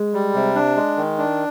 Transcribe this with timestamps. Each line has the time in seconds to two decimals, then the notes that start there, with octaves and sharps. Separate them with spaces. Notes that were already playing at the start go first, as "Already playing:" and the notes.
Already playing: G#3
0.13 G3
0.34 C3
0.55 D4
0.76 G#3
0.97 D#3
1.18 D4